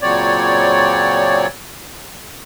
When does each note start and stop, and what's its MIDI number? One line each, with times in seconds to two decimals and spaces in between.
0.01 1.47 46
0.01 1.47 49
0.01 1.47 54
0.01 1.47 60
0.01 1.47 73
0.01 1.47 74